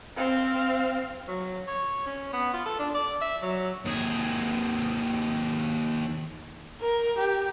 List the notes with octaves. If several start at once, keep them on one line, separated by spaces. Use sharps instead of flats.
C4 F5
F#3
C#5
C#4
B3
F4
A4
D4
D5
E5
F#3
D#2 G#4
A#4
G4